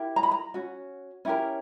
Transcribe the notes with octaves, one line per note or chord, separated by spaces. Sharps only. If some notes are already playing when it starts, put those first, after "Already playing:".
Already playing: E4 G4 A#4
A#5
B5
A#5
C#4 F#4
C#4 E4 G4 A#4